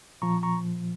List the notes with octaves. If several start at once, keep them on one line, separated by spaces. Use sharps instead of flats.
A#2 F3 A#5 C#6
A#5 C#6